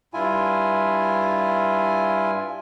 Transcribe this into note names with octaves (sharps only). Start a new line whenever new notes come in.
G2 E4 F4 G#5